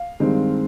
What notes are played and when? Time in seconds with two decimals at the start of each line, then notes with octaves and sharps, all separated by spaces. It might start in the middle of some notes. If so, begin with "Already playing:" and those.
Already playing: F5
0.20 G2 D#3 G#3 C4